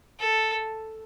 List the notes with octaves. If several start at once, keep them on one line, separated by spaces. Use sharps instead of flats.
A4